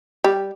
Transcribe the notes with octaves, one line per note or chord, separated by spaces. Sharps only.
G3